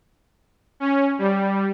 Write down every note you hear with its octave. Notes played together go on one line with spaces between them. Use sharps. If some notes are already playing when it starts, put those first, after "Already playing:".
C#4
G3